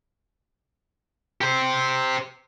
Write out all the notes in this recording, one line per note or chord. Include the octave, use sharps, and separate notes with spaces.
G4 C5